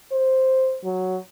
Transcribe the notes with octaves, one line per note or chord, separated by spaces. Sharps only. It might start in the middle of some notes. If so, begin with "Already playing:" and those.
C5
F#3